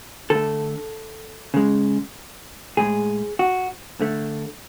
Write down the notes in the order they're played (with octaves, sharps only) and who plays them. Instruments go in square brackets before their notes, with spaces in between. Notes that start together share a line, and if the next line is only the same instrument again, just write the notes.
[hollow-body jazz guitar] D3 A3 A4
C#3 G#3
A2 G#3 G#4
F#4
D3 A3